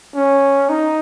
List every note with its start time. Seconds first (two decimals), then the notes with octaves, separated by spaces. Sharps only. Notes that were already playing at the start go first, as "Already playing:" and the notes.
0.15 C#4
0.69 D#4